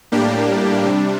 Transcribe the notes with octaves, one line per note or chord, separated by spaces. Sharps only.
A2 G3 A#3 D4 G4
C3 G3 D4